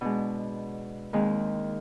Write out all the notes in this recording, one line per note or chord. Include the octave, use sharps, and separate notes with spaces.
B2 G#3 D4
D#2 D#3 G#3 C4